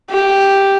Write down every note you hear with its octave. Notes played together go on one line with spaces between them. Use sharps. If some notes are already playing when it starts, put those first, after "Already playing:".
G4